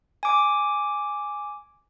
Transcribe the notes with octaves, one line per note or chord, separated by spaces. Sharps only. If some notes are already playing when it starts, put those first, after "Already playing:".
G#5 D6